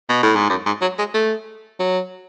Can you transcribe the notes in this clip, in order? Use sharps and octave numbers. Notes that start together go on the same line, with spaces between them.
B2
A2
G#2
F#2
G#2
F#3
G#3
A3
F#3